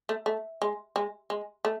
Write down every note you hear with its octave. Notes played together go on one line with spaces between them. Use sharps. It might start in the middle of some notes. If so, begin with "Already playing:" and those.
A3
A3
G#3
G#3
G#3
A3